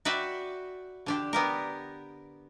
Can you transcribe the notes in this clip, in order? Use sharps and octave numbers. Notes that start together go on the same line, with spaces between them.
F#4 B4 D5 E5 G5
D3 D4 G4
B3 G4 A#4